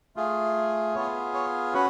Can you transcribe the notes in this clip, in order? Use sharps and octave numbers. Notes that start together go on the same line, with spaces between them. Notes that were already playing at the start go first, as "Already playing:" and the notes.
A3 F4 G#4
B3 F4 G#4 C#5
C#5
C#4 F#4 B4